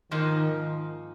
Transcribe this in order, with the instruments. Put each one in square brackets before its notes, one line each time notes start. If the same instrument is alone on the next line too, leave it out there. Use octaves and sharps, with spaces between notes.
[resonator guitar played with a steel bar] G#2 F3 A#3 D#4 [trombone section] D#3